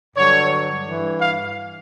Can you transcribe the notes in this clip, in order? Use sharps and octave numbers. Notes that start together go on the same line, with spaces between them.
G2 D3 F#3 C#5
G2 E3
F5